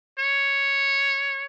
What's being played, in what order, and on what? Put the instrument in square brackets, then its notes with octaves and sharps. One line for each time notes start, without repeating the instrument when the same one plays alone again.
[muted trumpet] C#5